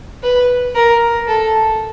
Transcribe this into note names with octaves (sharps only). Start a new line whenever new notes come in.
B4
A#4
A4